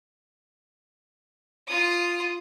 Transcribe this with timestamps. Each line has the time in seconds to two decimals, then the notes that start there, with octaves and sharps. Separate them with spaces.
1.68 F4 D#6